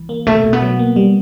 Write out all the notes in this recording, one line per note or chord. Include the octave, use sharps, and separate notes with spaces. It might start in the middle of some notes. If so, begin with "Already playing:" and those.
Already playing: E3
A#3
B2 A3
B2
B3
F#3
A#3
G3